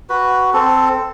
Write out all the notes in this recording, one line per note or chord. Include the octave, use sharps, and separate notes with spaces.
F#4 B4
C4 A4